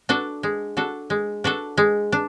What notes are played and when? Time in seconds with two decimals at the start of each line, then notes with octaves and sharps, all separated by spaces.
0.09 D4 F#4 A4
0.43 G#3
0.77 D4 F#4 A4
1.10 G#3
1.44 D4 F#4 A4
1.77 G#3
2.12 D4